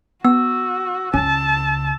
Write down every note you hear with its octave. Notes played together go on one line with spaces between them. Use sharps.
B3 F#4 E6
C#2 C#3 C#4 A5